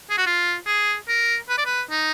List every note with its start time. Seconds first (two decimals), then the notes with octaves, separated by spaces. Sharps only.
0.10 G#4
0.18 F#4
0.27 F4
0.66 G#4
1.08 A#4
1.49 B4
1.58 D5
1.66 B4
1.90 D#4